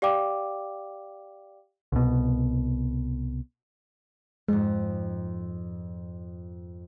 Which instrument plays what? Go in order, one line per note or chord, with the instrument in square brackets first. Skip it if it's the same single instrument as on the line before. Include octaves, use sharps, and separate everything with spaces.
[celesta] G4 D5 F5 G5 D6
[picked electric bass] C2 B2
[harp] F2 G#2 [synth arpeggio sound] G#3